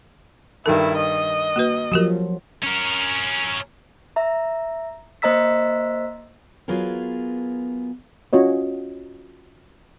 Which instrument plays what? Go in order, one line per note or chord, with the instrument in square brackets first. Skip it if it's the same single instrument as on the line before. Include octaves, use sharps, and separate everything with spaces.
[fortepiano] G2 D#3 A4 [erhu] E4 [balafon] A#4
[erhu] D#5
[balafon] A#3 F#4 B4
[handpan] F3 F#3 [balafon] F#4 G4 A#4
[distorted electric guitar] C#4 A#4
[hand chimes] E5 A#5
A#3 C5 D#5 A#5 E6 B6
[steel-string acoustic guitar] F#3 B3 F4 G#4 A#4
[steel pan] C#4 F4 F#4 C#5 D#5